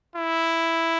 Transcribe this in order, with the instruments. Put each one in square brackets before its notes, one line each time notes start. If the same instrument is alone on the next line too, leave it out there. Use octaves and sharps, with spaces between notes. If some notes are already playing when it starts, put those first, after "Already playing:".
[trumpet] E4